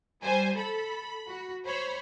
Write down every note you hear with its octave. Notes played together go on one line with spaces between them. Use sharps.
G3 C5 G#5
A4 B5
F#4
C5 C#5 B5